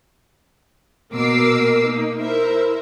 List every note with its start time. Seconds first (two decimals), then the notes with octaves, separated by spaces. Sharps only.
1.13 B2 A#3 A#4 D6 E6 C7
1.84 A#3 D#4
2.20 E4 A#4 C5 E5